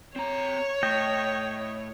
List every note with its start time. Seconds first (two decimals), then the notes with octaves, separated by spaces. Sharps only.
0.16 C4 C#5 A#5
0.83 A2 D#5 G5